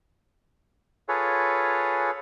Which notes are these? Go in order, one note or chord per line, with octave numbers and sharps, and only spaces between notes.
F4 G#4 A4 B4 C#5